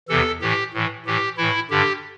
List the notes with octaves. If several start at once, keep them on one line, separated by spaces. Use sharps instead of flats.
E2 C3 E3 A4
A2 E3 G4
A2 E3
A2 E3 G4
A2 E3 E4
G2 D3 G4